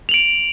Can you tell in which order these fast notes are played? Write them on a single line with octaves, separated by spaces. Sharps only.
F7 F#7 D7